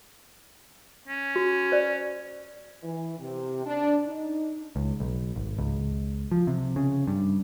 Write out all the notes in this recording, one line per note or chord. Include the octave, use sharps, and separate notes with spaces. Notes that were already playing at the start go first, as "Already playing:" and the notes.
C#4
F#4
C5 D5
E3
C3
D4
D#4
C#2
B1
G#1
C#2
F3
C3
C#3
G2